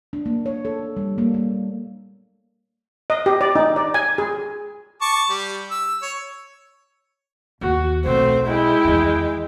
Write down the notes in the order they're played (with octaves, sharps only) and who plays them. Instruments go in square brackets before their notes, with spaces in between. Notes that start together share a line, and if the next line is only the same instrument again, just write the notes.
[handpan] D4
A#3
C#5
A4
G3
A#3
A#3
[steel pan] D#5
G4
D5
D#4
D5
G#5
G#4
[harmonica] A5 C#6 D6
G3
E6
C#5
[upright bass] D#2 [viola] F#4
[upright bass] B1 [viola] A3 C4 [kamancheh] C5
[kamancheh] G#3 [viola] E4 G5
[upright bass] E2 D#3